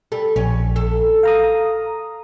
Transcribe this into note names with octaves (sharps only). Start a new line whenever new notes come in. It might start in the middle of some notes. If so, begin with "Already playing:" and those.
G3 A4
A#1 C#4
A4
F5 A#5 D#6